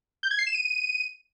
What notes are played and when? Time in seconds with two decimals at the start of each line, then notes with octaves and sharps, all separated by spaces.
0.23 G6
0.31 G#6
0.39 C7
0.47 E7
0.54 D#7